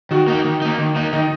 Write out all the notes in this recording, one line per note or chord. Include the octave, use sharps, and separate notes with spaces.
D#3 F#4
A#3 D#4
D#3
A#3 D#4
D#3
A#3 D#4
D#3 D#4